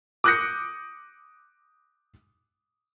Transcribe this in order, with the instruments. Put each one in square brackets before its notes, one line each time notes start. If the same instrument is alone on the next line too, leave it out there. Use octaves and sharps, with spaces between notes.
[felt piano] D6 D#6 F#6 G6 A#6 C#7